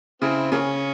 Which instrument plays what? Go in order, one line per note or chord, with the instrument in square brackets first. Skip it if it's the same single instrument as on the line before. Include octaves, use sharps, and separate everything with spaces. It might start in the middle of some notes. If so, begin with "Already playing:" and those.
[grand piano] C#3 [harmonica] C4 E4
[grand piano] C#3 [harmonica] F3 A#3 C#4